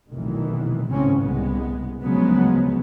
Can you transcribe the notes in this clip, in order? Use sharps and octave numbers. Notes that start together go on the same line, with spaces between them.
F1 B1 A#2 D#3 E3
G#1 C#2 A2 C#3 C4 C#4
C2 G#3 B3
D2 C#3 F3 F#3 G#3 B3